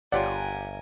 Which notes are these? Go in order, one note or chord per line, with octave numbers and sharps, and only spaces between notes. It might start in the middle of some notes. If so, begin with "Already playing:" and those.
G1 F4 G4 A#4 C#5 D5 F#5 G#5